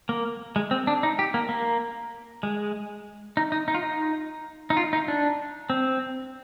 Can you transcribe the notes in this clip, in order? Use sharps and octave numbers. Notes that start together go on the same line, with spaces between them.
A#3
G#3
C4
D4
D#4
G4
A#3
A#3
G#3
D#4
D#4
D#4
F4
D#4
D#4
F4
D#4
D4
C4